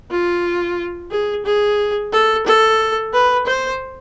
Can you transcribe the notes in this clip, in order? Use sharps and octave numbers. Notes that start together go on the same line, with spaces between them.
F4
G#4
G#4
A4
A4
B4
C5